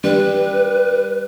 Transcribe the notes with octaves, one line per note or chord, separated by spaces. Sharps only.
G3 B4